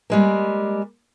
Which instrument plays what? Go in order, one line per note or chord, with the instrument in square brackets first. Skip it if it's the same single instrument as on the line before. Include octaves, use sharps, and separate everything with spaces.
[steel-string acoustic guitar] G3 G#3 A#3